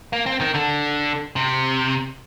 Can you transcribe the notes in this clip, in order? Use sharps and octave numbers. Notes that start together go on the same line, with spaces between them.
A#3
C4
D#3
D3
C3